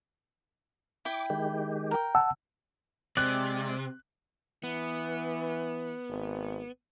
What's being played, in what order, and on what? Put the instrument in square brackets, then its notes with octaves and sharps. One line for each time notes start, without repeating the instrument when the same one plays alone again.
[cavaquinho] E4 G5 [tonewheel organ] D6
[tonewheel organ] D#3 G#3 G4
[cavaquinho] A#4 G5
[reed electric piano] F#5 A5 E6
[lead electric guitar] C3 [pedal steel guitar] G#3 G4 D5 [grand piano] F#6
[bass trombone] E3 [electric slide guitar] B3
[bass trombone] G#1